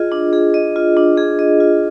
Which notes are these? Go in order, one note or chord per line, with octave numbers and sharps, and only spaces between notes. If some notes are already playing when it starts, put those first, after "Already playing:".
Already playing: F4 G#4 D#5
D4
G#4
D#5
F4
D4
G#4
D#5
F4